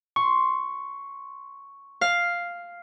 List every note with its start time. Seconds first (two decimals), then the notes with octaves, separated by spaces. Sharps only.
0.16 C6 C#6
2.01 F5